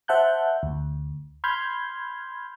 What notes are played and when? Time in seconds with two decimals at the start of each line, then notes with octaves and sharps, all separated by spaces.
0.08 C5 E5 F#5 A5 F#6 G6
0.63 D2
1.44 B5 C6 F6 G6 G#6